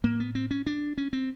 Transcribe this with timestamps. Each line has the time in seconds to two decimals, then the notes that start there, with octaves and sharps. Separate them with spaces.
0.04 A2 A#3
0.20 B3
0.35 C4
0.51 C#4
0.66 D4
0.98 C#4
1.13 C4